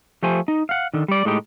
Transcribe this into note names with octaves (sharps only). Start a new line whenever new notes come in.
F3 A3 G4 C5 G#5
D#4
F5 F#5
D3 D#3
G3 D5
A2 G#3 D#4 G4